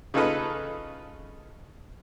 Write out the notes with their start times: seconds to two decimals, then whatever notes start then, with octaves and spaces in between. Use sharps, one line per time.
0.14 C#3 D#4 F4 A4 B4 D#5